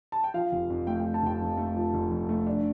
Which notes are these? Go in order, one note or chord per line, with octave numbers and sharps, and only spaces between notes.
A5
G5
F3 F5
F1
F2
A3 G5
F3 G5
A5
F1 G5
F2
A3
F3
F1
F2
A3
D4